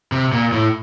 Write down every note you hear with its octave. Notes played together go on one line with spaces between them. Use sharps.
C3
A#2
A2